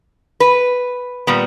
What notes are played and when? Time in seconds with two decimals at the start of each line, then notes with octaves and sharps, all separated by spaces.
0.40 B4
1.27 A#2 G3 B3